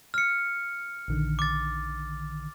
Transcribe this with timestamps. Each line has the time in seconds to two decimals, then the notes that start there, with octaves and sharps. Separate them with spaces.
0.14 F6 C#7
1.08 A#1 D3 D#3
1.39 D6 A6